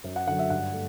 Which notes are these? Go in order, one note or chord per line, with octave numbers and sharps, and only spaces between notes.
F#2
F#5
D3 F#3 F#5
E5
G2 F#5
A3